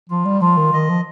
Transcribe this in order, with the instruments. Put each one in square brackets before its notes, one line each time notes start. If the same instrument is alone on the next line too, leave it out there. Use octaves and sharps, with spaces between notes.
[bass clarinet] F3 [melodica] F4
[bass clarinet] G3
[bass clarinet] F3 [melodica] F4
[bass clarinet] D#3
[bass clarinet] D#3 [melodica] D#5
[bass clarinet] F3